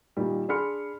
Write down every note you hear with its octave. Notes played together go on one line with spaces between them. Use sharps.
A#2 D#3 G3
D4 G#4 B5 C6 F6 C#7